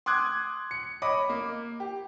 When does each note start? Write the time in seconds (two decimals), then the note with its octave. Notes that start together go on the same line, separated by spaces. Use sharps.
0.06 C6 D6 D#6 F#6 G#6
0.71 C#7
1.02 C#5 D#5 B5 D6
1.29 A#3
1.80 G4